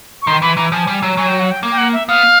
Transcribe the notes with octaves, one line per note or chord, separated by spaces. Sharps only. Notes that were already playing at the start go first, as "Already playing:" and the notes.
C#6
D#3 C6
E3 B5
E3 A#5
F3 G#5
G3
F#3
F#3 G#5
G5
F#5
G5
A#3
G5
F#5
E5
B3 F5